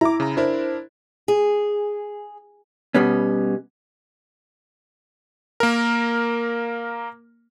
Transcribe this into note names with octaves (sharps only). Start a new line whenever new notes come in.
E4 A#5 D6
C#3 A#5
D4 E4 A#4 C5
G#4
B2 G3 B3 C#4
A#3 A#4